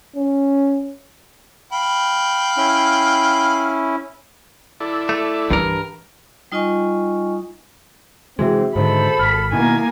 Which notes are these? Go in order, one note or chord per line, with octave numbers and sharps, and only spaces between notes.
C#4
F5 G5 B5
C#4 E4
E4 A4 D5
A3
G2 E3 G3 A#4
G3 D#4 F4 D#5 G#5 C#6
C3 E3 G#3 C4 F#4 G#4 E5
G#2 D3 D#3 A4 C5 B5
G#1 F6 B6
B2 D#3 A#3 E4 G#5